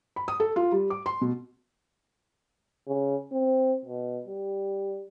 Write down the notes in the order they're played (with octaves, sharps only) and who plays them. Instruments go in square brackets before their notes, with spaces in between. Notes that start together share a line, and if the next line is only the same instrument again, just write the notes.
[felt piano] B5
D#6
A4
F4
G3
D6
C6
B2
[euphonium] C#3
C4
B2
G3